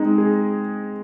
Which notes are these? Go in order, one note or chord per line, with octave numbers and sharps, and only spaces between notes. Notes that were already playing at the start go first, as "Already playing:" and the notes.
Already playing: G#3 C4 D#4
G#4